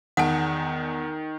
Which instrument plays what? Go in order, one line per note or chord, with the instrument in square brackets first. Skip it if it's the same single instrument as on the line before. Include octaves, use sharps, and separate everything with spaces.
[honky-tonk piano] E2 [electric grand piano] D#3 [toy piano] F#5 A5